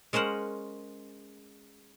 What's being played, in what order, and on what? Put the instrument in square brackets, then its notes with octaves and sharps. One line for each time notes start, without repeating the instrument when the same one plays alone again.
[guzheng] G#3 C#4 A#4 C5 F#5